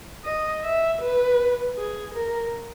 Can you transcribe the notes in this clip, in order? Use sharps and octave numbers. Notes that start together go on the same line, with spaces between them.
D#5
E5
B4
G#4
A#4